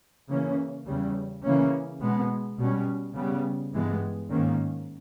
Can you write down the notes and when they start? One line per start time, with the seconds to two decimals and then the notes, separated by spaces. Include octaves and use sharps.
0.30 C#3 E3 A#3 C#4
0.86 E2 C#3 G3
1.44 C#3 E3 A#3 C#4
2.01 B2 G#3 B3
2.59 B2 G3 C#4
3.15 C#3 G3 B3
3.73 G2 E3 G#3 B3
4.30 G#2 D#3 A#3 C#4